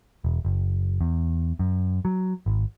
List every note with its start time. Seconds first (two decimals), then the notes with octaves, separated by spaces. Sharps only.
0.24 E1
0.45 F#1
1.01 E2
1.59 F#2
2.05 F#3
2.46 G#1